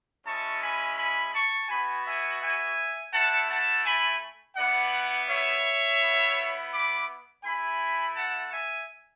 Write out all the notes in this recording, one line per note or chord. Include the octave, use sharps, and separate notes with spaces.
G#3 C#4 E4 A5 C#6
G#5 B5
G#5 B5
A5 C#6
B3 F#4 G#5 B5
E5 G#5
E5 G#5
A3 E4 F#5 A5
F#5 A5
G#5 B5
B3 E4 D5 F#5
C#5 E5
B3 E4
B5 D6
A3 E4 G#5 B5
F#5 A5
E5 G#5